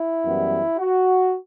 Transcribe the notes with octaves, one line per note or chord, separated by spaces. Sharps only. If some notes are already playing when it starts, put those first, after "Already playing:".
Already playing: E4
F#2 E3 G3 B3
F#4